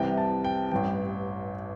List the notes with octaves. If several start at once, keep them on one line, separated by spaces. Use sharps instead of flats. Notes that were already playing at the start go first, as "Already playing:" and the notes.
Already playing: C2 C3 E3 G5
A5
G5
A1 G2 E3 G5